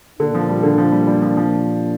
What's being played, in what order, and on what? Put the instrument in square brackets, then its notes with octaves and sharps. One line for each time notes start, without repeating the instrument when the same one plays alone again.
[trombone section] A#2 A#3 D4 [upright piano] D3
[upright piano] F3
G3
D3
F3
G3
G3
F3
F3